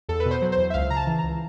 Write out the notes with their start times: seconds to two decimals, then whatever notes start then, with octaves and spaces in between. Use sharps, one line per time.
0.09 E2 A4
0.20 B4
0.26 B2
0.31 C5
0.42 F#3
0.52 C5
0.58 E2
0.70 E5
0.74 C#2 F5
0.90 C#3 A#5
0.96 A5
1.07 E3
1.19 C#2 A#5